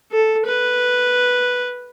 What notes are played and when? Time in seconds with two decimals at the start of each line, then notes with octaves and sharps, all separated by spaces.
0.12 A4
0.45 B4